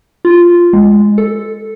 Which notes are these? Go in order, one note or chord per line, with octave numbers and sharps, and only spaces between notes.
F4
G#3
A4